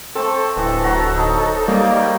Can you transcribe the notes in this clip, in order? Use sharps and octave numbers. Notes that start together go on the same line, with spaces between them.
A3 C4 A4
D1 E3 G4
F#3 F#4 A#5
D#4 D#5
D#3 G3 A#3 D#4 D5